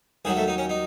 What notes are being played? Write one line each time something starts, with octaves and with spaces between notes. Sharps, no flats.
D#2 D#3 F#3 G#4
A3
D#4
C#4
D#4